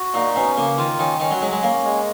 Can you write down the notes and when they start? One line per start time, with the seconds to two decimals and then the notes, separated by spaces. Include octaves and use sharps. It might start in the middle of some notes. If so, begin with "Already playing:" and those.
Already playing: F#4
0.14 A#2 D#4
0.35 B2 C#4
0.57 C#3 A#3
0.78 D#3 F4
0.99 D#3 C#4
1.20 D#3 C#4
1.31 F#3
1.42 F#3 G#3
1.52 G#3
1.63 A#3 C#4
1.84 G#3